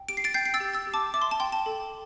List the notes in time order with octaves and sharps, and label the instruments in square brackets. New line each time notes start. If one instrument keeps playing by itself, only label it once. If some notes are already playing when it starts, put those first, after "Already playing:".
Already playing: [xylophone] G5
G4 D7
C7
A6 D7
G5 G6 C7
C7
E6 A6
G4
E6 A6
G4
A5 D6
E5 D6
C6
A5
G5 C6
A5
A4